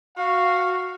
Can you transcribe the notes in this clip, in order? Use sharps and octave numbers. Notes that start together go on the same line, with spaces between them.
F#4 F5